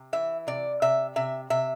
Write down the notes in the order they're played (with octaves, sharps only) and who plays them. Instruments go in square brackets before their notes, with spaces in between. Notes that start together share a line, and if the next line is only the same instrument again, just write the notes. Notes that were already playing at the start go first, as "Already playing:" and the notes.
Already playing: [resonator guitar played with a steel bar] C3
E3 E5
C3 D5
C3 E5
C3 E5
C3 E5